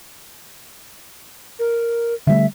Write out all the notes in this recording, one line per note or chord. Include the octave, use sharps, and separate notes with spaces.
A#4
D3 G3 A3 E5